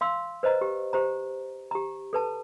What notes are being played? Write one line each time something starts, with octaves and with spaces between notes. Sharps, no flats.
F5 C6 E6
B4 C5 D#5 A#5
G4
G4 C5 A#5
G4 A#5
A4 B4 A5